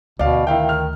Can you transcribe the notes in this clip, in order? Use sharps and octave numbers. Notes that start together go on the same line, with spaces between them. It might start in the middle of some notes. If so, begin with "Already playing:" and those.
D2 B2 D5 F5
D#3 E4 F5 G5
F6